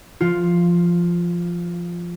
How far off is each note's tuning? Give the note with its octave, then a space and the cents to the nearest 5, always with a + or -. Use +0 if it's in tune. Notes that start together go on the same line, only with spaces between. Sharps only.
F3 -15 F4 +5